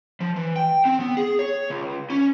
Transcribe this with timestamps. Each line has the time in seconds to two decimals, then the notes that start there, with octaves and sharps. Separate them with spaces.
0.20 F3
0.36 E3
0.56 G5
0.85 C4
1.00 B3
1.17 G#4
1.39 C#5
1.70 C#2
2.10 C#4